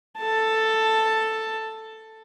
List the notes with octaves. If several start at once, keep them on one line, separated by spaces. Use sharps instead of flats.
A4 A5